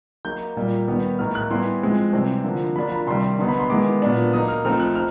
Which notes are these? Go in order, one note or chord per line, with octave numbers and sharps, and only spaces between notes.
F#3 A#3 D#4 G6
A#2 G3 A#3
D#3 G3 B3
A2 F#3 A#3 D#4 F6
F#6
E3 G3 B3 E4 C6
F3 G#3 C4
C3 E3 G3 C4
D3 F3 A#3
F#3 A#3 D4 F4 B5
B5
C3 D#3 G3 C6
D3 F#3 B3 D#4 C6
B5
C6
D#3 G#3 B3 E4 D6
A#2 F#3 B3 D4
F#3 A#3 D#4 D#6
F6
F3 A3 C4 D#4 F6
F#6
D#4 F6